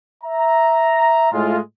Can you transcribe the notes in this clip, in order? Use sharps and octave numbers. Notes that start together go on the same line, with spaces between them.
E5 A#5
A2 G#3 F4